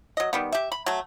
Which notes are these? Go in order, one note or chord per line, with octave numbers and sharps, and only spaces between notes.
F#3 D#5
D#3 G3 B3
G4 E5
B5
F#3 A3